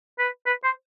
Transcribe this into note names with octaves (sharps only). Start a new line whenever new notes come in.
B4
B4
C5